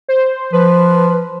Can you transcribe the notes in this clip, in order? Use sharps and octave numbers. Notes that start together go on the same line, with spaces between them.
C5
F3 B4